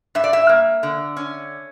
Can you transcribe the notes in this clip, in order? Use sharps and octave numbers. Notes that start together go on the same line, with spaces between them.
G2 E5
D5
E5
A#3
D3
C#4